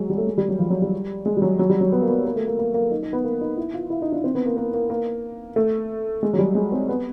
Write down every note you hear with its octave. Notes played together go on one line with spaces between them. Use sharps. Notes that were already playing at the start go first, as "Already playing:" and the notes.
Already playing: F#3 G#3
G3
A3
G#3
G3
F#3
F3
F#3
G3
G#3
G3
F#3
F#3
G3
F#3
B3
A#3
B3
A#3
A3
A#3
A#3
A#3
D#4
D#4
B3
A#3
D#4
E4
F4
E4
D#4
D4
C4
B3
A#3
A#3
A#3
A#3
A3
G#3
F#3
G3
G#3
C4
B3